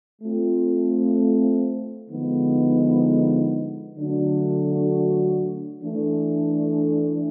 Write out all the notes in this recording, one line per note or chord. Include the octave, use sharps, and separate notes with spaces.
A3 C4 F4
D3 F3 G#3 B3 D#4
D3 F#3 A3 D4 F#4
E3 A3 D4